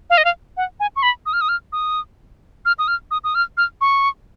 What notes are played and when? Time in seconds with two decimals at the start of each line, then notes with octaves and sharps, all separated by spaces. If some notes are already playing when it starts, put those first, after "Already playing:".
0.10 F5
0.18 D#5
0.25 F5
0.57 F#5
0.80 G#5
0.96 C#6
1.03 B5
1.26 D#6
1.33 F6
1.41 D#6
1.49 F6
1.72 D#6
2.65 F6
2.79 D#6
2.88 F6
3.11 D#6
3.24 D#6
3.35 F6
3.57 F6
3.81 C#6